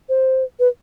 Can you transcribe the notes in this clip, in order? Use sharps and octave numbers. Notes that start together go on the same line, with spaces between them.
C5
B4